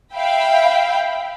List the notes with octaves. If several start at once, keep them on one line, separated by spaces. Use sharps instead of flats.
E5 F5 G5 B5